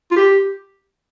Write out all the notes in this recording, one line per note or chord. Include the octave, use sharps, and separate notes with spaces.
F4
G4